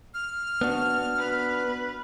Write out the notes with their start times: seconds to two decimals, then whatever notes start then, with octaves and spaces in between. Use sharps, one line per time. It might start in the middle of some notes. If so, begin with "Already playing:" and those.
0.14 F6
0.61 B3 D4 F#4
1.19 B4